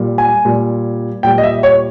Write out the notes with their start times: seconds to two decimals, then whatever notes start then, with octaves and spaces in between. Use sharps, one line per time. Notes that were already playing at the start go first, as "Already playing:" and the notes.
Already playing: A#2 G3
0.18 G#5
0.45 A#2 G3
1.23 A#2 G3 G5
1.38 D#5
1.43 E5
1.63 C#5